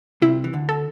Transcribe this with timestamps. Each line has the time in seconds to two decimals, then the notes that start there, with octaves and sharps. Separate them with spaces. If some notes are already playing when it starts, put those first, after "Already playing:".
0.22 C2 C3 E4
0.44 E3
0.53 D2 D3
0.69 A4